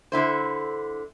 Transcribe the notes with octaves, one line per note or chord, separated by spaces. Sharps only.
D3 E4 C5